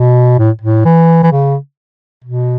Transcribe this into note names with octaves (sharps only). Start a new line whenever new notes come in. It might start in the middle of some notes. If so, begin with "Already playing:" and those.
Already playing: B2
A2
A2
E3
E3
C#3
B2